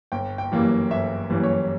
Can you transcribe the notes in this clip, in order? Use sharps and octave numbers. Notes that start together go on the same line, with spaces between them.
G1 G5
G5
F#2 E3 G3 A#3
G1 E5
F#2 E3 G3 A#3
C#5